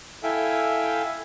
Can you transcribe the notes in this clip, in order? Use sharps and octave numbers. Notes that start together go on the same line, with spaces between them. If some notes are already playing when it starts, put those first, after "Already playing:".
E4 A4 E5 F5 G5 G#5